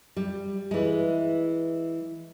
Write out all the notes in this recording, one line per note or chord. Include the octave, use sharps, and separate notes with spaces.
G3
E3 G#3